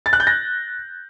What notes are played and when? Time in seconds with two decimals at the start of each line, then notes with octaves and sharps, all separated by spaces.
0.06 A6
0.13 F#6
0.20 G6
0.27 A#6